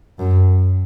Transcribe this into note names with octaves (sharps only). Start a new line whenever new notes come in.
F#2